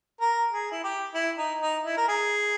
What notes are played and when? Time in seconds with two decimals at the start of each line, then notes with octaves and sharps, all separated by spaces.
0.21 A#4
0.52 G#4
0.71 E4
0.84 G4
1.14 E4
1.38 D#4
1.62 D#4
1.85 E4
1.97 A#4
2.08 G#4